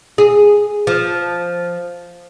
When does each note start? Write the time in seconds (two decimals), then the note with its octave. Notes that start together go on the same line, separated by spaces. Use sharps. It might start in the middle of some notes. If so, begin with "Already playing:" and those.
0.18 G#4
0.87 F3